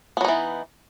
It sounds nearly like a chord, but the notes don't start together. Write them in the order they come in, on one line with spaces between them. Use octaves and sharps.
B3 F#3 D#4 E3